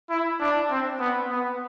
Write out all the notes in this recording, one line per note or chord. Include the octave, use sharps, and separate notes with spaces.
E4
D4
C4
B3
B3